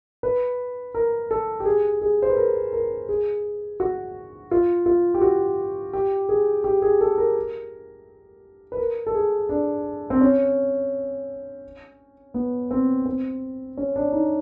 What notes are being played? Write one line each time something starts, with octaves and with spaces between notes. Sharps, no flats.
B4
A#4
A4
G4
G#4
G#4
C5
B4
A#4
A#4
G#4
F#4
F4
F4
G4
F#4
G4
G#4
G4
G#4
A4
A#4
B4
A#4
A4
G#4
D4
C4
C#4
B3
C4
C4
C#4
D4
D#4